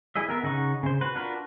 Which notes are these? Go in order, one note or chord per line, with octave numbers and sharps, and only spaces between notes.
E4 G#4 D#5 E5
B3 A#4 E5
C#3 D#4 F#5 C#6
C#3 C5
F#4 B4
D4 F4 F#4 A#4 B4